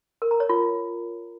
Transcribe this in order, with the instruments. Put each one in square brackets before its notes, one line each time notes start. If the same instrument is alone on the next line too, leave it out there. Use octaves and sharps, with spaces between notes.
[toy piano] A#4
A#5
C#5
F4